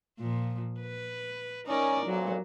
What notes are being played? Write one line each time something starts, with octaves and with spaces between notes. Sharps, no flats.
A#2 F3
B4
C#4 D#4 A#4 D5
B1 F2 A#2 F#3